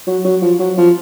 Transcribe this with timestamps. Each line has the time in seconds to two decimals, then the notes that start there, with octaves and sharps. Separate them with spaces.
0.07 F#3
0.25 F#3
0.42 F3
0.60 F#3
0.78 F3